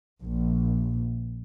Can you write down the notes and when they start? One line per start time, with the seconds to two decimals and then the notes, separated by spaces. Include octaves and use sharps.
0.21 A#1